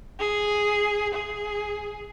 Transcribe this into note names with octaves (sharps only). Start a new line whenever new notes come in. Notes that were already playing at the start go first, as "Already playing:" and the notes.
G#4
G#4